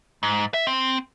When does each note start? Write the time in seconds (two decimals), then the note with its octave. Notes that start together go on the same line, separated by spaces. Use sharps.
0.23 G#2
0.54 E5
0.67 C4